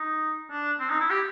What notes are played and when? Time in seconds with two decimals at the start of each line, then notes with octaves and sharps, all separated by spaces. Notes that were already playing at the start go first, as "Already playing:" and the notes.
Already playing: D#4
0.50 D4
0.80 C4
0.90 D#4
1.00 E4
1.10 G4